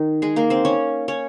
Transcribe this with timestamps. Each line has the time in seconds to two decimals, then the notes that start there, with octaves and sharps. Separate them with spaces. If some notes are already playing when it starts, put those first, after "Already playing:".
Already playing: D#3 D#4
0.22 G#3 G#4
0.36 A#3 A#4
0.50 C4 C5
0.65 C#4 C#5
1.08 C#4 C#5